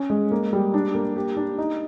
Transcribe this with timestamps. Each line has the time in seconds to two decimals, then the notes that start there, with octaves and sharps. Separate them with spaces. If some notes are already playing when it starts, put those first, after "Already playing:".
Already playing: C#4
0.10 G#3
0.31 A#3
0.53 G3
0.74 D4
0.94 A#3
1.16 G4
1.37 D4
1.58 D#4